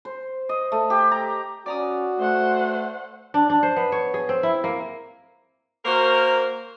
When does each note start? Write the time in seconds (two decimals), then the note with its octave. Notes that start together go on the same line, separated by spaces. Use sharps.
0.05 C5
0.49 D#5
0.72 A3
0.90 G4
1.11 A#5
1.66 C#4 F#4 D5 A#5 D#6
2.19 A3 C5 F#5
3.34 D4
3.50 D4
3.63 C5
3.77 B3
3.92 C#5
4.14 G#4
4.29 C4
4.43 E4
4.64 A#3
5.85 A#3 F#4 A#4 C5